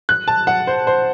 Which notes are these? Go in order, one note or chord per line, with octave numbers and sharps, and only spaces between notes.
F#6
A5
F#5
C5
C5